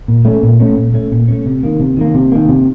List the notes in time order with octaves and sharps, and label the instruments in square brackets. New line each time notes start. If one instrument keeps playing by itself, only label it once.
[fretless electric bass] A#2
A3 C#4
A#2
A3 C#4
A#2
A3 C#4
A#2
A3 C#4
C3
D#3 A#3
C3
D#3 A#3
C3
D#3 A#3
C3